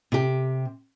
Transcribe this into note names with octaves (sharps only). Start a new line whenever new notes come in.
C3 G4